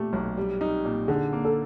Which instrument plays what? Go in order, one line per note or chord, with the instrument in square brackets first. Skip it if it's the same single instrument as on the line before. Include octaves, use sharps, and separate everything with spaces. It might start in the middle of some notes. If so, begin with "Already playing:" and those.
Already playing: [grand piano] A#2 A3 [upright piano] G4
[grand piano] B1
G3
D#4
A#2
[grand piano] D3 [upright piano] G#4
[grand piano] A#3
[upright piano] A4